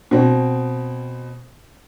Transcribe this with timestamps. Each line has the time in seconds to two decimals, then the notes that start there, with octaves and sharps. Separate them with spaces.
0.11 B2 C4